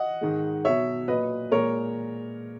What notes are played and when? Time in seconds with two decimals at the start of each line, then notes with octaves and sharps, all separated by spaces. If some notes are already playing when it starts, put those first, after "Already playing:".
Already playing: D#5 F#5
0.21 G#2 D#3 G#3
0.64 B2 F#3 C#5 E5
1.08 A#2 F#3 B4 D#5
1.52 A#2 G#3 A#4 C#5